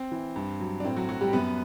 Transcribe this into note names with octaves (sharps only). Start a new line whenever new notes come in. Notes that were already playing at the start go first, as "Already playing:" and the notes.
Already playing: C4
E3
G2
F#3
D4
A2 C4
F#3 F#4
F#3 F#4
G3 G4
F#2 B3 B4